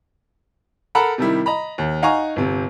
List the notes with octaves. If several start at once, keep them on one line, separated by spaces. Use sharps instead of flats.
A4 A#4 F#5 A#5 B5
C3 D#3 G3 E4
D#5 A#5 B5
D#2
D#4 F5 F#5 G#5 A#5 C#6
G1 C3